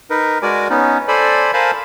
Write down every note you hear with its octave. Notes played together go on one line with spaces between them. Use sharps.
D#4 A#4 B4
G#3 F#4 A#4 D5 G#5 D6
B3 C#4 D#4
A4 C5 D5 G#5 B5
A#4 C5 F5 G#5 A5 B5